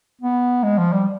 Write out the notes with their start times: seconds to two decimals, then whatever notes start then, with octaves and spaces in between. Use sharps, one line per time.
0.22 B3
0.63 G#3
0.78 F3
0.93 G3